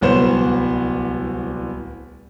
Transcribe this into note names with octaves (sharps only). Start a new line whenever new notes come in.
D1 C2 B3 C5 E7